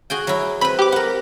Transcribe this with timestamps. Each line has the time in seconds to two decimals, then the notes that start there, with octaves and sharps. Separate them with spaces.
0.10 F#4 G#4 G5
0.27 F#3 E4
0.61 C4 B4 B5
0.79 G4 D6
0.92 A#4 F#5